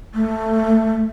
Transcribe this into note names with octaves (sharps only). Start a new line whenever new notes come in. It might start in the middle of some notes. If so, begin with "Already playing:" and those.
A3